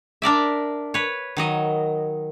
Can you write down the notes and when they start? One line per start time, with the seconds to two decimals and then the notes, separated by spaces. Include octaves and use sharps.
0.22 D4 A#4 D5 E5
0.94 B4 C#5
1.37 D#3 F#3 D#5